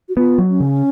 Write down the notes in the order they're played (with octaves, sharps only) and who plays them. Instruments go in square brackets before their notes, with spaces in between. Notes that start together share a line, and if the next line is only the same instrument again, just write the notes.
[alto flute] F#4
[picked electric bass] B3 [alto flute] F4
[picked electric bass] F#3
[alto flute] C#4
[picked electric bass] C#3